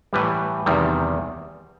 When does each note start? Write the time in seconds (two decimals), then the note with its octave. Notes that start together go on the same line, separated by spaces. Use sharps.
0.13 A2 E3 G3 B4
0.66 E2 C3 D#3 G3